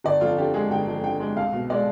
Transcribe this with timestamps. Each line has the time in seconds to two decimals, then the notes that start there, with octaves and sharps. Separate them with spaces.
0.04 G1 D5
0.21 F2 F4
0.38 D3 G4
0.54 G#3 G#4
0.70 G1 G5
0.88 F2
1.03 D3 G5
1.20 G#3
1.37 C2 F5
1.53 B2
1.70 G#3 D5